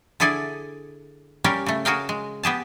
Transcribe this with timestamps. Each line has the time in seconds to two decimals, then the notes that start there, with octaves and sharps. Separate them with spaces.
0.20 D3 E4 G#4 A4 D5 G#5
1.44 G3 C#4 G4 A#4 F5
1.66 C#3 A3
1.85 F#4 G#4 A#4 F5 G5
2.09 G#3
2.43 B3 G4 G#4 A5